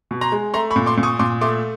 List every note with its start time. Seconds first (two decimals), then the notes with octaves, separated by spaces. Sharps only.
0.11 B2
0.21 A#5 C6
0.32 G#3
0.54 A3 A#5 C6
0.71 B5 C#6
0.76 A#2
0.86 C6 D6
0.97 A#2
1.03 C#6 D#6
1.19 A#2 C6 D6
1.41 A3 C6 D6